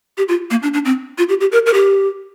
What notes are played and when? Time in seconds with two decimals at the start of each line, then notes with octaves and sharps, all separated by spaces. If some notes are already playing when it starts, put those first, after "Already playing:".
0.18 G4
0.29 F4
0.51 A#3
0.63 D4
0.74 D4
0.85 C4
1.18 F4
1.29 G4
1.41 G4
1.52 A#4
1.66 A#4
1.74 G4